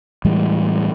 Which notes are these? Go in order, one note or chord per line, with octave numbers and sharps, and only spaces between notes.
A2 E3 G3 G#3